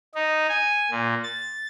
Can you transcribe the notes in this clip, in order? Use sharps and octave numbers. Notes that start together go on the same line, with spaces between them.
D#4
G#5
A#2
A6